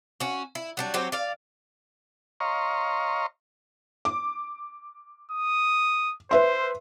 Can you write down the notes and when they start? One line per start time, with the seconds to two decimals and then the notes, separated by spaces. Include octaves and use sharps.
0.20 C#4 F#4
0.55 E4
0.77 F#3 G3 D4
0.94 F#3 C4 G4
1.12 D5 F5
2.40 C#5 D#5 F5 A#5 C6 C#6
4.05 D6
5.32 D#6
6.31 B4 C5 E5 C6